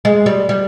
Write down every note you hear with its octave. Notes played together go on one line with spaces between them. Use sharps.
G#3
G3
G3